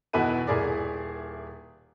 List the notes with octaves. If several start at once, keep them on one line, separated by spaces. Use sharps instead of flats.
E2 B2 D#4 E4 B4 D#7
D#1 E4 G#4 A#4 D5